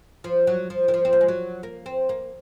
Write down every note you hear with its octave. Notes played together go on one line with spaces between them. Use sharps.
F3
F#3
F3
D#3
F3
C4
A#3
G#3
F#3
A#3
C4
A#3